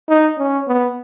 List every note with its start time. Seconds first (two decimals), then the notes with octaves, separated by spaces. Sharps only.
0.09 D#4
0.38 C#4
0.67 B3